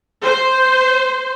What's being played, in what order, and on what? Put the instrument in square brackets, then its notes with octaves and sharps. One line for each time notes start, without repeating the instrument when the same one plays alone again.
[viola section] C5